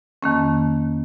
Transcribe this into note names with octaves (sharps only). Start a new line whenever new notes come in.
F2 D#3 A#3 C#4